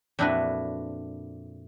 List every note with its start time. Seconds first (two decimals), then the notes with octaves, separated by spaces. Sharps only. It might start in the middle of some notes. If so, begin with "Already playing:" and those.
0.19 F2 A#2 D4 E4 F#4 B4